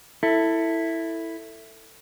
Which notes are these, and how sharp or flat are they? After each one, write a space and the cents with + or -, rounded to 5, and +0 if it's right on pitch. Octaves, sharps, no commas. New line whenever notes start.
E4 +0 A4 +20